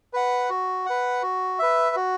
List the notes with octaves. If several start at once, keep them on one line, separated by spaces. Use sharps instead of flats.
B4 F#5
F#4
B4 F#5
F#4
B4 E5
F#4